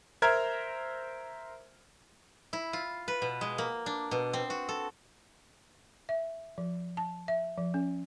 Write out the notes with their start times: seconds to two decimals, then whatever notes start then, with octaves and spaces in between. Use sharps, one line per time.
0.22 A#4 C5 E5 A#5 F6 G#6
2.53 E4
2.73 F4
3.08 B4
3.22 B2
3.41 G#3
3.58 A#3
3.86 D4
4.11 B2
4.33 C4
4.50 F#4
4.69 A4
6.09 E5
6.58 F3
6.97 A5
7.28 E5
7.58 F3
7.74 C#4